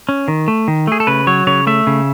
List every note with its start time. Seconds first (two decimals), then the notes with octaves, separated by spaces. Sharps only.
0.09 C#4
0.28 D#3
0.48 A3
0.68 D#3
0.87 A3 G#4
1.00 A4
1.07 C#3 B4
1.27 F#3 C#5
1.47 C#3 C#5
1.67 A3 E5
1.87 C#3